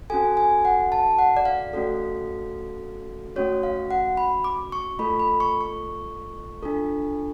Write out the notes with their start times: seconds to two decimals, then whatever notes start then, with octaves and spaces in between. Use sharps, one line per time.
0.10 C#4 F#4 A4 G#5
0.37 G#5
0.65 F#5
0.92 A5
1.19 F#5
1.37 D5
1.45 F5
1.73 A3 C#4 F#4 A4
3.36 A3 C#4 F#4 C#5
3.63 F5
3.91 F#5
4.17 B5
4.44 D6
4.72 C#6
4.99 A3 F4 A4 B5
5.20 B5
5.40 C#6
5.61 C#6
6.63 D4 F4 A4